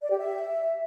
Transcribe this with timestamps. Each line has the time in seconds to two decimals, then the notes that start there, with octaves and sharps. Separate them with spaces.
0.01 D5
0.10 G4
0.19 E5